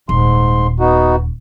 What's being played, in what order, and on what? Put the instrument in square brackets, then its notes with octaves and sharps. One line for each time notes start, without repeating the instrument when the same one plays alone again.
[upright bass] D#1 [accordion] G#2 C6
[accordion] B3 D#4 F#4